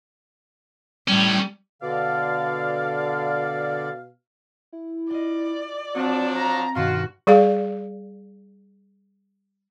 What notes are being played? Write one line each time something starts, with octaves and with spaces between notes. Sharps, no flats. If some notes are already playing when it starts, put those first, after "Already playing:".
A2 G3 C#4
B2 D3 D5 F5
E4
F4 D5 D#5
F3 F#3 C4 D4
A#5
G2 B2 D#3 F4 F#4
G3 G#4 D5 F5